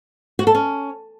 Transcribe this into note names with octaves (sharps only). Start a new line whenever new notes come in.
F#4
A4
C#4